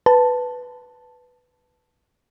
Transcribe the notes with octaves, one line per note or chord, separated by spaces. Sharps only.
B4 A5